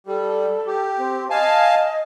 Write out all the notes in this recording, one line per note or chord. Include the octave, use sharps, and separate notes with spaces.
G3 A4
G4
C4
D#5 F5 G#5 A5